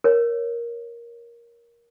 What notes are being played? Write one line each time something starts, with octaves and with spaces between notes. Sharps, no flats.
A#4 C#5